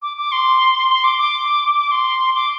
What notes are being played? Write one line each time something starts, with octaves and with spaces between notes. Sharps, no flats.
D6
D6
C6
C6
D6
D6
D6
C6
D6